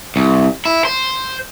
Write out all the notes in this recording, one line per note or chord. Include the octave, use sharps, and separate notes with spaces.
C2
E4
C5